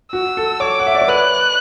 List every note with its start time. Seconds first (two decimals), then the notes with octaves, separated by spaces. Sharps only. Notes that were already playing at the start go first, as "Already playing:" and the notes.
0.12 F#4 E6
0.37 A4
0.60 C#5 D6
0.80 F#5
0.87 E5
0.95 D5
1.01 C#5
1.08 B4 F#6